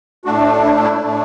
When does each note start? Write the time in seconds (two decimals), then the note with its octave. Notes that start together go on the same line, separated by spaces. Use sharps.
0.25 A2 A3 D4 F#4
0.64 E4
0.83 E4
1.02 A2 A3 D4